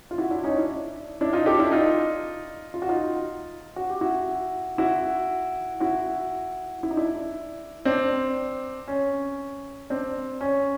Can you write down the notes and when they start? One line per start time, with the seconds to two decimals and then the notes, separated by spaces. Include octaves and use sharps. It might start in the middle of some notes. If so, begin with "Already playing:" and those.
0.11 F4
0.18 E4 F#4
0.31 D4 E4
0.43 C#4 D#4
0.56 D4 E4
1.21 D4 E4
1.33 D#4 F4
1.46 G4 A4
1.59 D4 E4
1.71 D#4 F4
2.74 F4
2.82 F#4
2.89 D#4 F4
3.76 F#4
3.89 G4
4.01 E4 F#4
4.78 E4 F#4
5.80 E4 F#4
6.83 E4
6.91 D#4
6.97 D4 E4
7.85 C4 D4
8.88 C#4
9.90 C4 D4
10.41 C#4